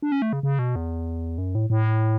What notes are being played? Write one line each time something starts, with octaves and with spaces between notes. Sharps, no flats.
D4
C#4
A3
C#3
C#3
B2
E2
F#2
A2
A2